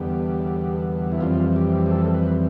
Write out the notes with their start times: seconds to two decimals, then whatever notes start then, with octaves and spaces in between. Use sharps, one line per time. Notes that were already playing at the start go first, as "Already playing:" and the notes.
Already playing: E2 D3 G3 B3 G4
1.12 E4
1.21 F2 E3 G3 C4 F4
1.56 G4
1.86 G4
1.91 A4
2.14 B4